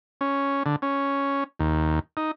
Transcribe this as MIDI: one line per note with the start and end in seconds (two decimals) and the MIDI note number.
0.21 0.63 61
0.66 0.76 50
0.82 1.44 61
1.60 2.00 39
2.17 2.31 63